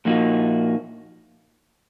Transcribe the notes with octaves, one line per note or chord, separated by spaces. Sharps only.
A#2 F3 A#3 D#4 F#4